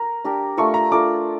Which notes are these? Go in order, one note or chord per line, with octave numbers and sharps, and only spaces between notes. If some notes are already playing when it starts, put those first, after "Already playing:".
Already playing: A#4 A#5
D4 G4 A#4
A3 D4 F4 A#4 C#6
A#5
A3 D4 F4 A#4 D6